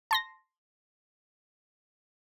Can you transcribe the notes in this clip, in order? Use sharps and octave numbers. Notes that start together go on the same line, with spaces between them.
A5 C6 A#6